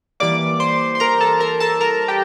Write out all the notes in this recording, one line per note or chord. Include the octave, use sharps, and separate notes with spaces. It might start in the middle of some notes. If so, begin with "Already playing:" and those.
E3 G3 A#3 D5 D6
C5 C6
C6
A#4 A#5
A4 A5
A#4 A#5
A4 A5
A#4 A#5
G4 G5